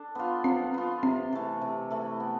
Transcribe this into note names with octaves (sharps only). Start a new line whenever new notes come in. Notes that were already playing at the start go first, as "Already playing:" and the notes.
Already playing: D4 A4
B3 F4
F3 C4
B3 F4
C3 C4
E3 A3
C3
E3 A3
B3